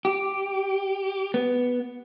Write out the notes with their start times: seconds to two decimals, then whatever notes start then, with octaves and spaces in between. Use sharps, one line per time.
0.05 G4
1.34 B3